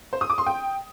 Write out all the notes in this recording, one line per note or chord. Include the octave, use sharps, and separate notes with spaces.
C5
D#6
D6
C6
G5